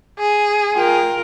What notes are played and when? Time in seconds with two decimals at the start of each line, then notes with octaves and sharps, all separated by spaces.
0.19 G#4
0.74 F4 A#4 G5